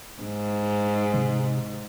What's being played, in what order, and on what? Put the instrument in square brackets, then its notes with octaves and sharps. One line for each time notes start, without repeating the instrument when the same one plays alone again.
[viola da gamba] G#2
[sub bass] C3